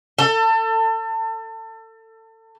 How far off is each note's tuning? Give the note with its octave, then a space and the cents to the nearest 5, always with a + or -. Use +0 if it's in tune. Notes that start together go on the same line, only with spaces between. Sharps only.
A4 +30